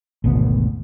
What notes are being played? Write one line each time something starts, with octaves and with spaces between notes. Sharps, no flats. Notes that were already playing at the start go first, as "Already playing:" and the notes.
G#1 D2 B2 B3